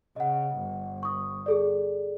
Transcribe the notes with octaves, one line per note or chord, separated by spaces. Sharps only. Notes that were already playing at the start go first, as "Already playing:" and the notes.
C#3 D#5 F#5
G1
C#6 D#6
G#4 A4 D5